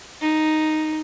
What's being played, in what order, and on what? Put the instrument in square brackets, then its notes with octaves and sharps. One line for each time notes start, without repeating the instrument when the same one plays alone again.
[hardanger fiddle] D#4